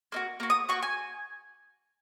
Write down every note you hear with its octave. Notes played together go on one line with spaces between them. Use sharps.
A#3 D#4 F#4
A#3 F#4
D#6
A#3 C#4 F#4 C#6
G#5